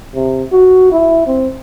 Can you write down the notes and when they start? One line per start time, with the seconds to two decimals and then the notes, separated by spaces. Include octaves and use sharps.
0.14 C3
0.52 F#4
0.92 E4
1.27 C4